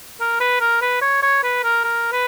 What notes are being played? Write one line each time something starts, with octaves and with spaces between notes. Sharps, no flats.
A#4
B4
A#4
B4
C#5
C#5
B4
A#4
A#4
B4